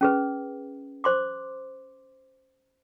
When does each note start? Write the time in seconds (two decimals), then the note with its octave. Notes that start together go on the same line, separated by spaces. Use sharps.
0.01 C#4 G#4 B4
1.04 C5 C6 D6